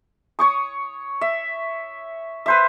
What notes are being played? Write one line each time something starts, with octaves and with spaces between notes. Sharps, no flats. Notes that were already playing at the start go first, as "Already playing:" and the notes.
C#5 C#6 D#6
E5
B4 C5 E5